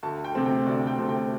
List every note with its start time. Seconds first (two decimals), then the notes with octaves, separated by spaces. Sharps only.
0.03 D2 A5
0.25 G5
0.35 C3 A3 C4
0.46 G5
0.66 D2 D5
0.87 G5
0.98 C3 A3 C4
1.09 G5